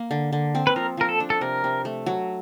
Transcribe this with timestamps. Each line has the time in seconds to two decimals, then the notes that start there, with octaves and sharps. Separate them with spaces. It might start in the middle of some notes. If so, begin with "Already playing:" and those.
Already playing: A#3
0.11 D3
0.32 D3
0.55 C4
0.67 B4
0.76 F3 A#4
0.97 F3 A#4
1.09 A4
1.20 D4
1.30 A4
1.41 C3 A#4
1.64 C3
1.85 A3
2.06 F#3